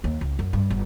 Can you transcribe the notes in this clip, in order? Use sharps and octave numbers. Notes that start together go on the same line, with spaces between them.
D#2
C#2
F#2
G2
G1